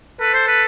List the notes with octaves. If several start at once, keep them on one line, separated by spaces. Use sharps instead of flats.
A4 B4
C5
B4